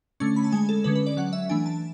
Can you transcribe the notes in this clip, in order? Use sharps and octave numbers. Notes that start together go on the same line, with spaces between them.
D3 A3 C#4 C#6
B5
A5
G#3 C#4 G#5
A4
D3 G#3 C#4 B4
B4
D5
F#3 C#4 F#5
E5
E3 A3 D4 G#5
A5